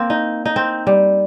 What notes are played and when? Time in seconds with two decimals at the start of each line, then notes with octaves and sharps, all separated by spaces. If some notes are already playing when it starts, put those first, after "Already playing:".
Already playing: A#3 C4
0.10 D#4
0.46 D#4
0.56 C4
0.87 G3